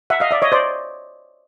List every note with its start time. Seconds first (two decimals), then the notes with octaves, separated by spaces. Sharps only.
0.10 E5 F#5
0.20 D#5 F5
0.31 D5 E5
0.42 C#5 D#5
0.52 C5 D5